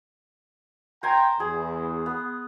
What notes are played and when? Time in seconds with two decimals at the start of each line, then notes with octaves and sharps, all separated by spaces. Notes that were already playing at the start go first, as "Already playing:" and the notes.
1.03 C5 G5 G#5 A#5
1.40 E2 G#4
2.06 B3